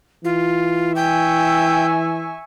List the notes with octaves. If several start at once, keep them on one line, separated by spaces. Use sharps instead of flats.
E3 F4
E5 G5 G#5 C#6